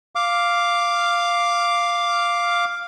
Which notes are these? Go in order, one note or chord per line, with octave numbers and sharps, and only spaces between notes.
F5 D6